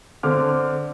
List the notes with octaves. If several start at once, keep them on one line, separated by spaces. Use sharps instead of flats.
D3 C4 D6 F6